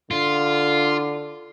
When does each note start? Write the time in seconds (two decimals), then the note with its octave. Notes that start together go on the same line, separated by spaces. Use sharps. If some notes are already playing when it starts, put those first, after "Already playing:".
0.11 D3 F4